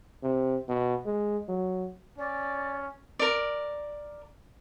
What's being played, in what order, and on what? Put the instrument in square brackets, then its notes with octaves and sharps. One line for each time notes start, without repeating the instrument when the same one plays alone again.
[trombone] C3
B2
G#3
F#3
[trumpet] C#4 [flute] D5
[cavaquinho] A#4 D5